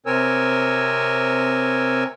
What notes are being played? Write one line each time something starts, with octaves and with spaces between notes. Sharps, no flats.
C3 C4 A#4 C#5 G#5 E6